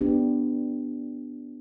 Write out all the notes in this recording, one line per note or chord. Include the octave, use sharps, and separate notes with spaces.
B3 D4 G4